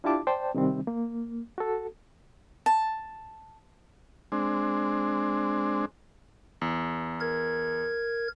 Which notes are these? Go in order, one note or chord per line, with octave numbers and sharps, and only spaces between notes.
D4 E4 F4 G4 A5 D6
C5 D5 G5 A5
C3 D#3 G3 C4
A#3
F#4 A4
A5
G#3 C4 D4
E2
A#4 G#6